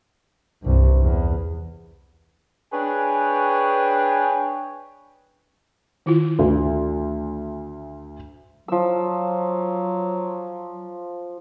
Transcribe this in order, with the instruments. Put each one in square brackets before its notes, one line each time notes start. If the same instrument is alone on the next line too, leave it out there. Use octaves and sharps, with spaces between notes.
[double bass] C2 G2
E2
[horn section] D4 G#4 B4 C#5 G5 G#5
[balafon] D#3 E4 F4
[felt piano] D2
[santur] F3 E6 [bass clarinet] F#3